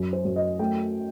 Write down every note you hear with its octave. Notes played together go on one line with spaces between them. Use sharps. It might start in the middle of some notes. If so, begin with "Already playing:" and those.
Already playing: F#2
C5
F#2
D#5
A3 G5